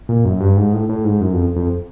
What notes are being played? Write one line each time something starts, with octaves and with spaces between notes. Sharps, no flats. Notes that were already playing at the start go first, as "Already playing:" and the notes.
A#2
F#2
G2
G#2
A2
A2
G#2
F#2
F2
F2